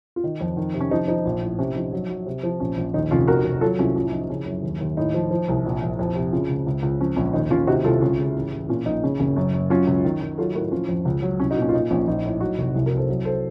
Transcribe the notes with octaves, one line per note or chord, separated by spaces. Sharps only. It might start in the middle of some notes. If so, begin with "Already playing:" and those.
F4
D#3 D#4
F2
D#3
C3
C#4
F3 D#4
F3 D#4
A#1
A2
C3 C#4
F3 D#4
F#3
F#3
C3
F3
A#1 C#4
A#1
D#2 D#4
F1 C#4 F4
D#3 F#4 A#4
F1
F#3 F4 A4
C2 C#4 F4
A2 C#4 F4
F3 D#4
C#3 C#4
F#2
D#2
D#2
A2 D#4
F3
F3
C2
A#1
A#1
F2
C3
C#3 C#4 F4
C#2
C#2
C#2
F3 C#4
A#1 C#4
D#2 D#4
D#2 C#4 F4
C3 D#4 F#4
C2 F4 A4
C#2 C#4 F4
C#3
A1
A1
A#2 C#4 F4
A#1 D#4
C#3 C#4
F#1 C#4
F#2 C#4
F#2
F#3 C#4 F4
C#2
D#3
D#3
F#3 F4 A4
A2 F#4 A#4
F3 C#4 F4
F2
C#2
F#3
C2 C#4
D#4 F#4
A#2
C#4
F4
A#2 D#4
A#1 C#4
A#1 D#4
A2
F#3 D#4 F#4
F1
C2
F#4 A#4
C2
A4 C5
F#3
A4 C5